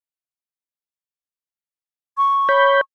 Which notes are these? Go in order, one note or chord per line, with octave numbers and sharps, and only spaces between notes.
C#6
C#5 B5 G6